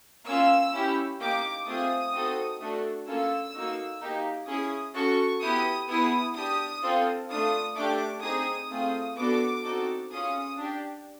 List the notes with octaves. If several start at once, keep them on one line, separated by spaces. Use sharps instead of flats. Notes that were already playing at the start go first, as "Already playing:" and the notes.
A#3 C#4 F4 E6
C#4 E4 G4
A#3 D#4 G4 D6
A3 C4 F4 G#4 D#6
C4 D#4 F#4 A4
A3 D4 F#4 A4
A#3 C#4 F4 A4 E6
A#3 D#4 F#4
A#3 D#4 G4
C#4 E4 G#4 D#6
C#4 F#4 A4 C#6
B3 E4 G4 D#6
B3 E4 G#4 D#6
D4 G4 D#6
C4 F4 A4
A3 D4 F4 D#6
A3 D4 G4 D6
C4 D#4 G#4 D#6
A3 C4 F4 G#4 D#6
B3 D4 F#4 A4 D6
C4 D#4 F#4 A4
C#4 F4 G#4 D#6
D4 G4